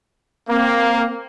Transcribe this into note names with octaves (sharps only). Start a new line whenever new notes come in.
A#3 C4